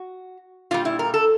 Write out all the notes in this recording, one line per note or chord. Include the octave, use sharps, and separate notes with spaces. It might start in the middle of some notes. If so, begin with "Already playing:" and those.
Already playing: F#4
A#2 G3 F4
E4
A#4
A4